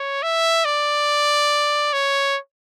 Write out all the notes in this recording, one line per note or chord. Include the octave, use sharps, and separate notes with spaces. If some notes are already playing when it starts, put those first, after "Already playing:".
Already playing: C#5
E5
D5
C#5